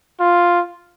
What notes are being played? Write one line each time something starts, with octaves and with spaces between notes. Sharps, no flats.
F4